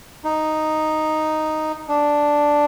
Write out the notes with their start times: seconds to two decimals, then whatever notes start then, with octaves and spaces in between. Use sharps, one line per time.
0.24 D#4
1.89 D4